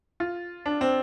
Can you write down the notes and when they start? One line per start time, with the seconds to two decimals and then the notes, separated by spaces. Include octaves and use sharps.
0.20 F4
0.66 D4
0.81 C4